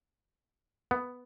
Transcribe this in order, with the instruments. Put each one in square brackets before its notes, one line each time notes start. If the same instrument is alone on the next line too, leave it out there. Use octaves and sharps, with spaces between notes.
[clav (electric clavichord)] B3